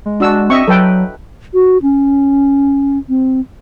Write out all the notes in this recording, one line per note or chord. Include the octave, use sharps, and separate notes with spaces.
G#3
D4 F#4 E6
C4 D#5 E5 C#6
F#3 A4 B4 G5
F#4
C#4
C4